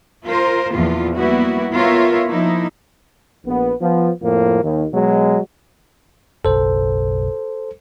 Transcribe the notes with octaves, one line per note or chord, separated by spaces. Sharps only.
F4 A#4 C5
E2 A#2 F3 F4
G3 A#3 B3 E4 F#4
B3 F4 A#4 C#5 E5
F3 A#3 D#4 E4
A#1 B3
F3 B3
F2 A2 F3 A#3
D#2
B2 F#3 G#3
F#1 B1 A4 C5